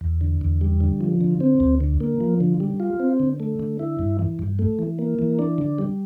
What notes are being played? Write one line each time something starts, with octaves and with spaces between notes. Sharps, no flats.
E2
D3
E2
G3
D3
F3
D3
C4
D2
D3
A#3
F3
D3
G3
F4
C4
D3
A3
D3
E4
G2
E3
G2
A3
E3
A#3
E3
D4
D3
G3